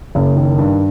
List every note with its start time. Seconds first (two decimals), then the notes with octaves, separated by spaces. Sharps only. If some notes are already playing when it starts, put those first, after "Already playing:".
0.15 F#1
0.36 D#3
0.58 G2